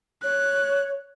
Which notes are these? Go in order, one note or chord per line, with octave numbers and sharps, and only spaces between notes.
C#5 F#6